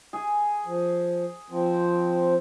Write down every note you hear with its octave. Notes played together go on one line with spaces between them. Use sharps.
G#4
F3
F3 C4